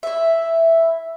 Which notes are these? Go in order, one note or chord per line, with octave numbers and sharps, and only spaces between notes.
E4 E5